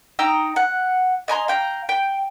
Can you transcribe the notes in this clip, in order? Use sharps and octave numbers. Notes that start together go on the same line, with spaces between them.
D#4 G5 A#5 E6
F#5
D#5 G#5 A#5 C6
F5 G5 A#5
G5